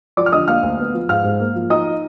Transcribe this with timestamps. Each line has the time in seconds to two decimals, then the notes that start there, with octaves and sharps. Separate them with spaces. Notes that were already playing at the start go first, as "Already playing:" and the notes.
0.17 F3 D5 D6
0.26 F6
0.32 D3 D#5 D#6
0.48 A#3 F5 F6
0.63 D2
0.79 B3
0.94 F3
1.09 G#2 F5 F6
1.24 G#2
1.40 A#3
1.55 F3
1.70 D#4 D#5 D#6